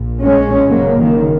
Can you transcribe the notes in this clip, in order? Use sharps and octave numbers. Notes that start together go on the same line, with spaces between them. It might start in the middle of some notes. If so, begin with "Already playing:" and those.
Already playing: A#1 A#2
G#3 C#4
F#1 F#2 C#3 F#3 A#3
D#3